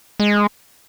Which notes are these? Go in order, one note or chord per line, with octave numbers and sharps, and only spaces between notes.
G#3